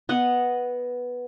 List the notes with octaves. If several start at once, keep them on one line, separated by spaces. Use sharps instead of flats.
B3 D#5 F#5